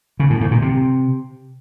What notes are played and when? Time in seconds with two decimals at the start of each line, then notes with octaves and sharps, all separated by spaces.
0.20 C#3
0.30 A2
0.41 G#2
0.51 A#2
0.62 C3